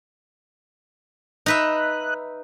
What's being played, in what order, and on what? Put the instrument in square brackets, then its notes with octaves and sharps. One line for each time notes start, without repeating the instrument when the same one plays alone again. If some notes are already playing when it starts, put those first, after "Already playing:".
[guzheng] D#4 B4 E5 [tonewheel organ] D#5 F#6